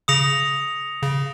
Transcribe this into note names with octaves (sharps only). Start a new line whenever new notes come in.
C#3 D#6 A#6 C#7 F7
C#3